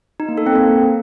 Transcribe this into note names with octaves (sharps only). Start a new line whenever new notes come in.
D#4
A#3
A4
C4
A#3